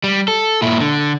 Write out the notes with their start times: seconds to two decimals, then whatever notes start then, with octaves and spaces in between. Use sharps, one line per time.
0.04 G3
0.28 A4
0.62 A#2 E4
0.80 D3